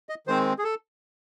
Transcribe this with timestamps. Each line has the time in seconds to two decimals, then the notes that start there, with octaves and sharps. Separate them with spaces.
0.09 D#5
0.27 D#3 G#3 C4 C5
0.59 G#4
0.64 A4